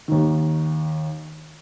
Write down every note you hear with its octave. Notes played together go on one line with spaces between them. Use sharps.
D#2 D#3